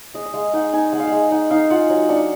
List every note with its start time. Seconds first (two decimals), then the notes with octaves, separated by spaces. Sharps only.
0.14 G#3 D#5
0.26 D#5
0.34 G#3 F5
0.54 D#4 F#5
0.73 D#4 G#5
0.92 G#3 F#5
1.00 F5
1.07 G#3 F#5
1.31 D#4 F#5
1.50 D#4 F5
1.70 F4 F#5
1.90 F#3
2.09 D4 F#5